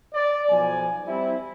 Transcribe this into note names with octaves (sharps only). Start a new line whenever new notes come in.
D5
B1 F3 G#5
G3 C4 E4